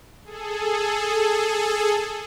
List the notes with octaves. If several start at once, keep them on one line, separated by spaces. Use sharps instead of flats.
G#4 A4